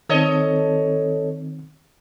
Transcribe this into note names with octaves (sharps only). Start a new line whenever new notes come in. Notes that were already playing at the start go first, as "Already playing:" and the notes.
D#3 C4 A4 C#5 D#5